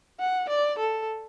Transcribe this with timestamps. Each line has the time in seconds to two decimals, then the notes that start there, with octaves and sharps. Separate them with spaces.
0.20 F#5
0.49 D5
0.79 A4